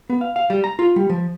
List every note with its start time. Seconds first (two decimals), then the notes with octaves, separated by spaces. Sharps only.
0.10 B3
0.21 F5
0.36 F5
0.50 G3
0.64 A#5
0.79 F4
0.96 G3
1.10 F3